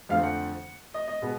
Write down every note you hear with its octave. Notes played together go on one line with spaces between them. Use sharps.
F2 D3 F3 A3 C4 F5
F#5
D#5
D#5
B2 G#3 B3